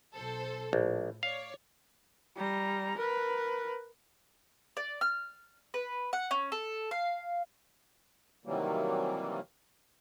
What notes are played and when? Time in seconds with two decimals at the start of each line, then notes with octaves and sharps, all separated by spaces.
0.15 B1 A4 C5
0.73 A#1 A2
1.23 C#5 D5 F5
2.37 G3 A#5
2.97 A#4 B4
4.77 D5
5.01 F6
5.74 B4
6.13 F#5
6.31 C#4
6.52 A4
6.91 F5
8.45 C3 D#3 E3 F#3 G3 A#3